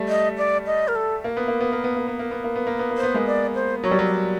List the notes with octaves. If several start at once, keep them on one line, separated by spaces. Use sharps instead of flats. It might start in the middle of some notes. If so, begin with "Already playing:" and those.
Already playing: G3 A3
D#5
D5
D#5
A#4
A4
A#3
B3
A#3
B3
A#3
B3
A#3
B3
A#3
B3
A#3
B3
A#3
B3
A#3
C5
B3
G#3 A#3
D5
C5
F#3 C#5
G3
F#3
D5